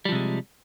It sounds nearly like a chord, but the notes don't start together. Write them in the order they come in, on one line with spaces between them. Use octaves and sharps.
G3 F3 C3 G#3